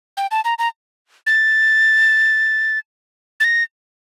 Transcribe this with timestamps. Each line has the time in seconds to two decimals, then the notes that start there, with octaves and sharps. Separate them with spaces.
0.17 G5
0.31 A5
0.45 A#5
0.59 A#5
1.27 A6
3.40 A6
3.44 A#6